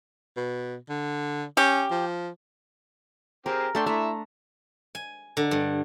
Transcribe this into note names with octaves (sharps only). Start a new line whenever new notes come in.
B2
D3
C#4 G4
F3
C4 G4 G#4 A#4
A3 D4 A4 G5 C6
A3 E4 E5 A#5
G#5
D3
G2